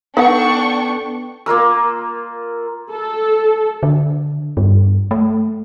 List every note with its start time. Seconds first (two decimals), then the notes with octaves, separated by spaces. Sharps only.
0.17 B3 D4 D#4 A4 B4 F#5 G5 C#6
1.46 A#3 F4 A#4 E6
2.91 A4
3.83 D3
4.57 G2
5.11 A3